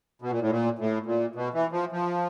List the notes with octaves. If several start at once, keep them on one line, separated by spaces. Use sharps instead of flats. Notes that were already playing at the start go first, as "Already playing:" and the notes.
B2
A#2
A2
A#2
A2
A#2
B2
E3
F3
F3